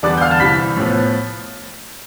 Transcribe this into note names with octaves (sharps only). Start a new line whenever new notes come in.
E2 D3 G3 B3 D5 D6
G6
F5 F6
A5 A6
C2 C3 E3 B5 B6
A2 F3 B3